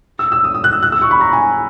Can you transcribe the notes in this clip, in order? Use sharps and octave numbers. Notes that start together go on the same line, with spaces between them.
E6
E6
D#6
D#6
F#6
E6
F#6
E6
C#6
B5
A#5
G#5